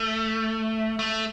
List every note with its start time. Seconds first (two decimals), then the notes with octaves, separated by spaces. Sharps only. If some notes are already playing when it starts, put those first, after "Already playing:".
Already playing: A3
0.99 A3